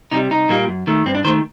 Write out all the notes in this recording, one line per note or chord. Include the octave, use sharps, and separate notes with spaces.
C3 G3 D#4
C2 D#4
A#2 G3 A#3
F#2
D#3 A3
G2 C4
D4
D#3 A3 C5